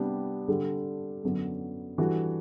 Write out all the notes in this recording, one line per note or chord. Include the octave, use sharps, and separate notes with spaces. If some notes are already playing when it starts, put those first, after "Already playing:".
Already playing: C3 G3 B3 D4 G4
D3 G3 D4
F#2 D3 F#3 B3
E3 G3 D4 F#4 A4